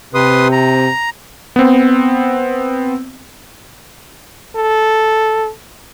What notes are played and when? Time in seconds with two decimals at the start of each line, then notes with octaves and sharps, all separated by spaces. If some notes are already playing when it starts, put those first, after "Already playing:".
0.15 C3 B4 C6 D#6
0.52 A#5
1.56 B3 C4
4.56 A4